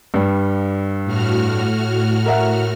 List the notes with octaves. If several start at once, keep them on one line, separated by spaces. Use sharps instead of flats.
G2 G3
A2 F#4 F6
A#4 E5 F#5